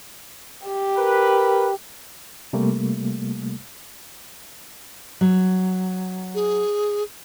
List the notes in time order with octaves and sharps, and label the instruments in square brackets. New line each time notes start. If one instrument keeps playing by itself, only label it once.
[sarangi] G4
[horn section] A#4 B4
[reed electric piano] C3 G3 A3 A#3
[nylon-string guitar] F#3
[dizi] G#4